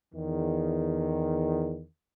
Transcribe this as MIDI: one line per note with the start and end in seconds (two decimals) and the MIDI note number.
0.14 1.85 40
0.14 1.85 51